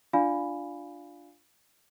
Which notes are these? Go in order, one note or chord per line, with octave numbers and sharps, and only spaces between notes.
D4 F4 D5 F5 G#5 B5